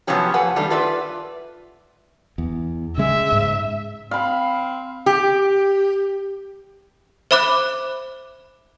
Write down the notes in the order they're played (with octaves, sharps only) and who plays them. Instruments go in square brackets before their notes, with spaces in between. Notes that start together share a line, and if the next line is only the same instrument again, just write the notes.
[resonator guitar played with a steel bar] C3 F3 F#3 B3 C#4 G4
F2 A3 B4 F#5 G#5
D#3 G3 A3 D4
F4 B4 D5 E5
[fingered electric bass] E2
[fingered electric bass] C#3 G#3 [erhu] E5
[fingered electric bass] G#2
[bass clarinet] C4 [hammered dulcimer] F5 B5
[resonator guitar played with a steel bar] G4
[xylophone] C5 E5 B5 D6 F#6